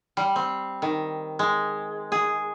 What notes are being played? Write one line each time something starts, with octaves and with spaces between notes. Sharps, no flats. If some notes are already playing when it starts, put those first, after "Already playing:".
G3
C4
D#3
G#3
G#4